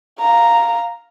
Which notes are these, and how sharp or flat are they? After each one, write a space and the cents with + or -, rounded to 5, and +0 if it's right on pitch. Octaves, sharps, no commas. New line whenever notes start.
F5 +0 A#5 +0